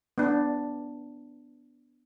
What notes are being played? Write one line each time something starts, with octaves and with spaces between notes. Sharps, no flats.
B3 D4